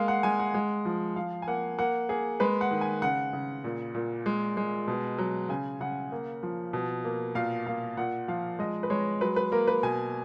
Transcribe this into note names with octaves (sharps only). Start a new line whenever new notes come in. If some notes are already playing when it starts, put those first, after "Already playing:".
Already playing: G#3 A#3 F5
F#5
G#3 G#5
F#5
G#3
F3
F3 F5
G#5
A#3 F#5
A#3 F#5
A#3 G#4
G#3 B4
F#5
D#3
G#5
C#3 F#5
C#3
A#2
A#2
G#3
G#3
B2
F#3
C#3 G#5
C#3 F#5
A#3
F3
B2
A#3
A#2 F5
A#2 F5
A#2 F#5
F3 F5
G#3 D#5
B4
G#3 C#5
F#3 B4
B4
A#3 A#4
B4
B2 G#5